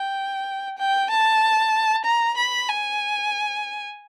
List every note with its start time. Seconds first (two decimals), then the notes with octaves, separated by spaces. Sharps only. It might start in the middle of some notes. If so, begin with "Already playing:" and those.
Already playing: G5
0.78 G5
1.10 A5
2.05 A#5
2.37 B5
2.69 G#5